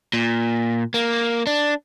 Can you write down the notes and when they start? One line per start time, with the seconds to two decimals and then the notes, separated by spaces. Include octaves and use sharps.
0.14 A#2
0.94 A#3
1.47 D4